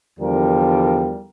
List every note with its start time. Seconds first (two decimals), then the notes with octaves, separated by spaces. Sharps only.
0.19 E2 D3 F3 G3 A#4